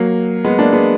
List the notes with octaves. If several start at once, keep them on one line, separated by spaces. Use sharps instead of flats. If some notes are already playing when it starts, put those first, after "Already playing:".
Already playing: F#3 A#3
G#3 B3
A#3 D4
G#3 B3